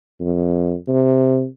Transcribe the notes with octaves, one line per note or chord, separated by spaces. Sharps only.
F2
C3